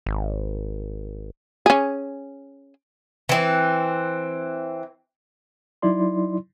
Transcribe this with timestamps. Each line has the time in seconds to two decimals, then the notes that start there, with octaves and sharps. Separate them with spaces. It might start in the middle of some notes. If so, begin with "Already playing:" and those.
0.06 G#1
1.66 C#4 G#4
3.29 E3 C4
5.82 F#3 D#4 E4 D5 C6